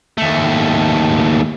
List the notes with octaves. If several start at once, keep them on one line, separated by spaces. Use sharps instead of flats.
D#2 A3